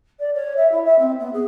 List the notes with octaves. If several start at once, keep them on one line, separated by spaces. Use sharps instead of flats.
D5
C#5
E5
E4
E5
C4
B3
G#4